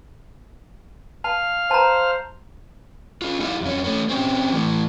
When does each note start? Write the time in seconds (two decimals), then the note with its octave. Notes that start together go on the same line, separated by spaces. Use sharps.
1.24 F5 A5 F6
1.71 C5 A5 A#5
3.22 C#4 F4
3.40 D#4 E4 G4 E5 F5
3.61 F2 C#4
3.84 A3 C#4
4.09 C4 C#4 G4
4.52 E3 A3